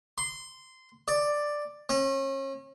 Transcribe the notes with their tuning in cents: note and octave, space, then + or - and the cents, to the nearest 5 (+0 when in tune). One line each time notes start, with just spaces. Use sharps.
C6 -15
D5 +5
C#4 -35